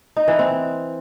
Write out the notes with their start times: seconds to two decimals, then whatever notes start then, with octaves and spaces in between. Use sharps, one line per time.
0.17 D#4
0.28 E3
0.39 C4